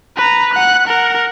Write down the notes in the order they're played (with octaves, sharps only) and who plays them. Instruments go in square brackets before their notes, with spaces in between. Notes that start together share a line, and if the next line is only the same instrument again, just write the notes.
[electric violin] B4 A#5
F#5 F#6
A#4 F#5